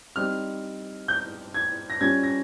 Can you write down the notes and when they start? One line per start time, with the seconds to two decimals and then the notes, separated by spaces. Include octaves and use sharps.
0.16 G3 C4 D#4 F6
1.08 G6
1.54 G#6
1.90 A#6
2.01 G3 C#4 F4 G#6
2.23 A#6